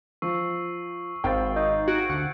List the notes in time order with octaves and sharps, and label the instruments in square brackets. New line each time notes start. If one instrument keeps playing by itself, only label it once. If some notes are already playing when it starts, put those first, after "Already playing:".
[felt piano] F3 [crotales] C#6 E6 C7
[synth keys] G#1 [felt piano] C5 F5 G5 [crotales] E6 A6
[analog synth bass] D#4 [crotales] C#6 G6
[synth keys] F#4 [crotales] G#6 D7
[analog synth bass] D2 [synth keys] F#5